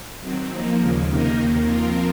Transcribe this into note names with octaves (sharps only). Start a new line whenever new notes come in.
D#3 F#3 C4
F3 A#3 D#4
D#2 C#3 G#3
C3 D#3 A#3 D#4 A#4
D#2 D#3 A#3
F3 C4 F4 A#4